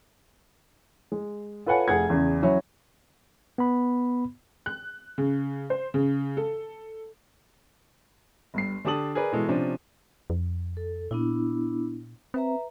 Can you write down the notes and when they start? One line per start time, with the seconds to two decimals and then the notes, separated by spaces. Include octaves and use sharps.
1.12 G#3
1.66 F4 A4 B4 C#5 F#5 G#5
1.88 F1 G#4 F#5 G#6
2.10 E2 C#3
2.42 E3 F#3 C#4 E4
3.58 B3 B5
4.66 F#6
5.18 C#3
5.70 C5
5.94 C#3
6.37 A4
8.54 G1 G2 C7
8.85 D3 D4 G4 A5 D#6 F#7
9.15 G#4 A#4 B4 D5
9.32 B2 E3 G#3 A4
9.49 C3 F3 C#4 D4
10.30 F2
10.77 A4
11.11 A#2 B3 D4 E4
12.34 C4 B4 E5 A#5